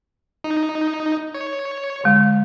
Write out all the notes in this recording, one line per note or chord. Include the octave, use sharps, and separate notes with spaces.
D#4
C#5
D3 G#3